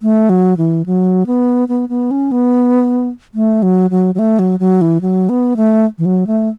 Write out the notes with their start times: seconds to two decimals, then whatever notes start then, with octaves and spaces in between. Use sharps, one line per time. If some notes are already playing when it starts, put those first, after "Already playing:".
0.02 A3
0.29 F#3
0.57 E3
0.86 F#3
1.26 B3
1.68 B3
1.89 B3
2.11 C#4
2.32 B3
3.35 A3
3.63 F#3
3.90 F#3
4.15 F#3
4.19 A3
4.39 F#3
4.60 F#3
4.81 E3
5.01 F#3
5.29 B3
5.57 A3
5.98 E3
6.05 F#3
6.27 A3